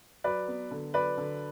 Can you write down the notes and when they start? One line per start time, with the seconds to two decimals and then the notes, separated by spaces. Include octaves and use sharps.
0.24 F#3 B4 D5
0.48 B3
0.71 D3
0.94 F#3 B4 D5
1.17 D3